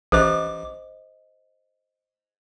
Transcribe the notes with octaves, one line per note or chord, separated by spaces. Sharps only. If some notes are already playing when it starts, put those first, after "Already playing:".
A1 A4 C5 D#5 D6